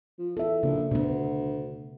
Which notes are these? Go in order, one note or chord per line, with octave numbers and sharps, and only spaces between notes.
F3
E2 A4 E5
A#1 C#3
D2 B2 B3